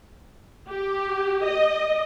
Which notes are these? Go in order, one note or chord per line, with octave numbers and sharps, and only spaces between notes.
G4
D#5